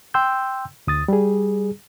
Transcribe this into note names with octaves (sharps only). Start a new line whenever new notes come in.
G5 C6 E6 G6
D2 D#6 A6
G3 G#4